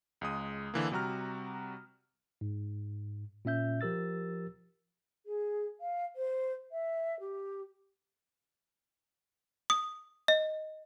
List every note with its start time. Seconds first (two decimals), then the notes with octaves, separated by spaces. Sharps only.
0.21 C#2 G#3 D#6
0.74 D3 E3 A#3
0.92 C3 G3 F#4 A#5 F6
2.41 G#2
3.45 A#2 C#4 E5 G6
3.81 F3 G4 A#4 E6 A6
5.26 G#4
5.81 F5
6.16 C5
6.72 E5
7.20 G4
9.70 D#6
10.28 D#5